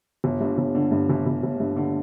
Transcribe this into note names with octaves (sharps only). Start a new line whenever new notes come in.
G1
G2
G1
D3
G2
G1
G1
G1
G2
D3